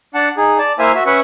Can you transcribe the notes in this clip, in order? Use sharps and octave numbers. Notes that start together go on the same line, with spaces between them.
D4 F#5 A5
D#4 G#4
D5 A5
A#3 E4 C5 E5 F5 G#5
F#4 E5
C#4 B4 E5 F#5 C#6